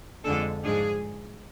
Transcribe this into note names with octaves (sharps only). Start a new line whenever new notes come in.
F2 D3 G#3 D4 A4
G#2 F3 G#3 D4 G#4